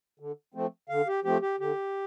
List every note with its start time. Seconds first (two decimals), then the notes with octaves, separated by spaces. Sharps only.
0.20 D3
0.54 F3 A3 C4
0.89 D3 F5
1.07 G4
1.24 F3 A3 C4 G4
1.42 G4
1.60 D3 G4